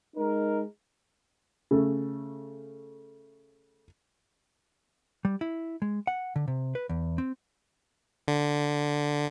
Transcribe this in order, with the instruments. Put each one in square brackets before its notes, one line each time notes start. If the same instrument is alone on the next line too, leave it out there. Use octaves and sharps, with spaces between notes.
[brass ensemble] G#3 D#4 A#4
[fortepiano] C#3 A3
[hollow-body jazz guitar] G3
E4
G#3
F#5
D3
C3
B4
E2
C4
[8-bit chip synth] D3